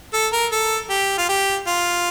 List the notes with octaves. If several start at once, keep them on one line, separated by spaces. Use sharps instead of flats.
A4
A#4
A4
G4
F4
G4
F4